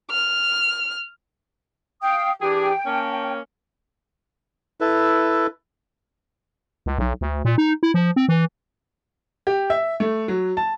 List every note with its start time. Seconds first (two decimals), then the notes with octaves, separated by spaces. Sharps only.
0.10 F6
2.02 F5 G5 D#6
2.41 E3 D4 G4 G#4 G5
2.86 A#3 C#4 A5
4.81 E4 A4 B4
6.86 C#2
6.98 B1
7.21 D2
7.45 A#2
7.58 D#4
7.83 E4
7.94 F3
8.16 C4
8.29 E3
9.47 G4
9.70 E5
10.00 A3
10.28 F#3
10.57 A5